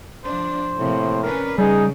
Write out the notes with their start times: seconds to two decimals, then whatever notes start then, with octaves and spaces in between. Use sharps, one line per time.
0.25 F3 D4 C5
0.79 A2 C3 F3 A#3
1.23 C#4 D4 A#4 B4
1.58 C#3 G3 D#4 G#4